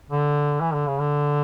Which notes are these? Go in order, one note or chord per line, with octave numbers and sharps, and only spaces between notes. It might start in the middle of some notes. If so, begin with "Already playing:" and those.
D3
E3
D3
C#3
D3